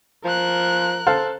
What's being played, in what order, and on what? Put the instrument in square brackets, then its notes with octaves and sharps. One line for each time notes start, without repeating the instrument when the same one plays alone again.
[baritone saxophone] F3 [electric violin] A#4 F#6
[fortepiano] A4 C5 F5